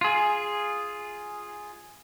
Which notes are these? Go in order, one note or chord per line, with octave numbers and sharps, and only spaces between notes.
F4 G#4